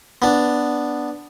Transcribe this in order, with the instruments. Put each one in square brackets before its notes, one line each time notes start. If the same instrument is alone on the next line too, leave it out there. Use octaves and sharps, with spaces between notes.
[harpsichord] B3 D4